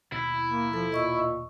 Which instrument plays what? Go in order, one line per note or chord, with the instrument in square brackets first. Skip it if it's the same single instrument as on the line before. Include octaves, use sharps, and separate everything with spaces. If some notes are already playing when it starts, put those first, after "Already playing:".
[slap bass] D#2 B2 [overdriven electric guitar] E4
[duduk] A#3
[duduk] F3 [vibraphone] A4
[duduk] A#2 [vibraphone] D#5 C#6 E6